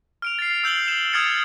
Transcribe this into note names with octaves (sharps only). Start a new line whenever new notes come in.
F6 D7 F7
A6 C7
E6 G6 F#7 G7
E7
D#6 F6 G#6 A6 C#7